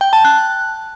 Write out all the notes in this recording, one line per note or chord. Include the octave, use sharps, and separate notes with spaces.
G5
A5
F#6